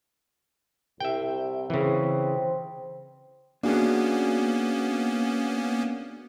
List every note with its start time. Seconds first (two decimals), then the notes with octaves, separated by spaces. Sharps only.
1.00 C2 E5 G5
1.70 C#3 E3 C4
3.63 A#3 B3 C#4 D4 F#4 G#4